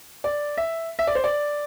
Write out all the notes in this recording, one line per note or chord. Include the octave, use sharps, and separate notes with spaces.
D5
E5
E5
D5
C5
D5